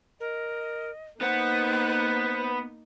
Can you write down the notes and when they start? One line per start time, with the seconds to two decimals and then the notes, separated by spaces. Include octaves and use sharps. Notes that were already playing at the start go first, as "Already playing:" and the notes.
0.20 A#4 D#5
1.21 A#3 B3 D#4 C5 F#5 F#6